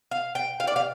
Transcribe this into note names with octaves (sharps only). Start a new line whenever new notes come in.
F5
G5
F5
D5
F5